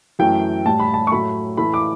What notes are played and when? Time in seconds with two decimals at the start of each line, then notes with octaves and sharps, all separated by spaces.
0.19 F#2 E3 A3 G5
0.66 A2 G3 A5
0.80 B5
0.94 A5
1.07 C#6
1.11 A2 F#3 A3 B5
1.57 A2 E3 A3 B5
1.74 D6